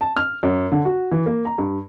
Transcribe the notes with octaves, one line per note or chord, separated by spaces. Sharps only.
A5
F6
F#2
D3
F#4
E3
A#3
A#5
G2